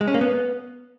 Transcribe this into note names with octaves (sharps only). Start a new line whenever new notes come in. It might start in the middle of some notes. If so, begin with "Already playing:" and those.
G#3
C#4
A#3
B3